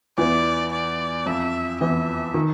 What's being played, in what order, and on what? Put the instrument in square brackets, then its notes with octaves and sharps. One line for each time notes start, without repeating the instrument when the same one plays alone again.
[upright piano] E2 E3 [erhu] D5
[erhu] D5
[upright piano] F2 F3 [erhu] E5
[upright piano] E2 E3 [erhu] E5
[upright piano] D#3